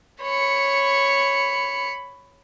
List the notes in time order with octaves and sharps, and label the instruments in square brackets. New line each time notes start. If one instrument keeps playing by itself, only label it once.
[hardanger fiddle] C#5 [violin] B5 C#7